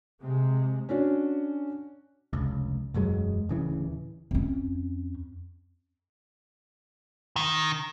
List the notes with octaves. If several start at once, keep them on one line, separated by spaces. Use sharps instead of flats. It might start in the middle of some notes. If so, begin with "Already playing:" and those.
C3 G#3
C#4 D4 F#4
F1 C#2
E1 F#2 F#3 G#3
D1 C#3 E3
F2 C#4
D#3